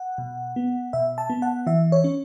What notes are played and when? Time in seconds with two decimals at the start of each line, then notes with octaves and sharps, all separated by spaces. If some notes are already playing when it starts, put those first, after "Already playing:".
Already playing: F#5
0.18 B2
0.56 B3
0.93 B2 E5
1.18 A5
1.30 B3
1.42 F#5
1.67 E3 E5
1.92 C#5
2.04 C#4